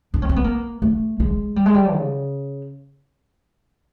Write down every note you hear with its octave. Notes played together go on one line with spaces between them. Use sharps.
D4
C#4
C4
B3
A#3
A3
G#3
G3
G#3
G3
C#3